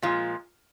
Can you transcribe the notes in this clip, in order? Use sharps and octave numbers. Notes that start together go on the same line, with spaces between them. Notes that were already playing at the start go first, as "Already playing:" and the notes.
A#2 F3 G#3 F4